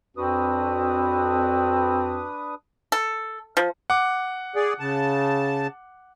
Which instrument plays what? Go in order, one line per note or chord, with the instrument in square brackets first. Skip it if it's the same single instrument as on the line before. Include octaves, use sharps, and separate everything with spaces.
[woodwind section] F2 F#4 [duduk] C4 [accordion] D4 B4 D#6
[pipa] A4
F3
[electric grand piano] F#5 D6
[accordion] G#4 D5
C#3 A5